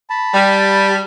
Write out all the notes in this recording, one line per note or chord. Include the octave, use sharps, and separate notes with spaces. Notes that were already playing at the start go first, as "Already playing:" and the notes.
A5 B5
G3